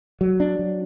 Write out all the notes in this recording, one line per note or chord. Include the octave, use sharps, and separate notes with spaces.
F#3
D4
F#3